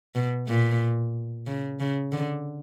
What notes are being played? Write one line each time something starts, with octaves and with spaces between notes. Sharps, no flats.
B2
A#2
C#3
C#3
D3